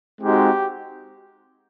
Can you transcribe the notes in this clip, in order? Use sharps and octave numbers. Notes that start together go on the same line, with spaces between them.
G#3 C4 D#4 F#4 G4